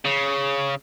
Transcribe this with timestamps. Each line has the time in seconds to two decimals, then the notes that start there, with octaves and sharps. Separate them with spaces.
0.05 C#3